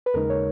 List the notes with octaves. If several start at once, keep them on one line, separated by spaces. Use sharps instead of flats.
B4
D#2 C#3 G#3 D#4 A#4
C#5